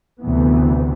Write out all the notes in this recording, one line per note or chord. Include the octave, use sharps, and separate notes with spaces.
D2 C3 E3 B3